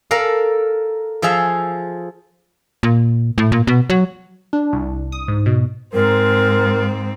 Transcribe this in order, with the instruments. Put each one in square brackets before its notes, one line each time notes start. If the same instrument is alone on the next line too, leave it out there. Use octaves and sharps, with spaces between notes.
[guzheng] A4 A#4 D5 F5
F3 G#4 E5 F5
[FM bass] A#2
A2
A#2
B2
F#3
[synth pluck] D4
C2
D#6
G#2
B2
[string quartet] G#2 C4 [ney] A#4